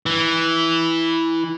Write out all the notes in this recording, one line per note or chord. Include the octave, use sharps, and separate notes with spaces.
E3